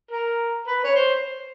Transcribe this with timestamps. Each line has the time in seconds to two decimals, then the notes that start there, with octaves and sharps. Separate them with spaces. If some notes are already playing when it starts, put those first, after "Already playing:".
0.11 A#4
0.67 B4
0.84 C#5
0.95 C5